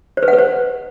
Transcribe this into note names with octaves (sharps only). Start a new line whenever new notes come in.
C5
B4
F#5
B4
C5